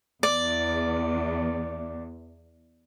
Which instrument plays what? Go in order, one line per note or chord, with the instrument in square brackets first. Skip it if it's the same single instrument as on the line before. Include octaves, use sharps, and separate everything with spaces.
[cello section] E2 [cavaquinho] D5